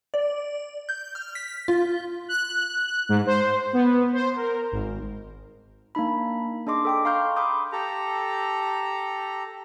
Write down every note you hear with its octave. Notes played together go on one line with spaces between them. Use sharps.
D5
G6
F6
B6
F4
F#6
G#2
C5
B3
C5
A#4
G#1
A#3 D4 D#4 B5
D4 G#4 D#5 C6 D6
A4 G5 D6
F5 A#5 C6 C#6 F6 G6
B5 C6 D6 D#6 G6
G4 A4 A#5